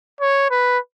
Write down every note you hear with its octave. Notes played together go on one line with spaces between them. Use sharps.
C#5
B4